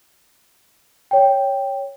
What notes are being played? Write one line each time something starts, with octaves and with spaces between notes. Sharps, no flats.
C#5 G5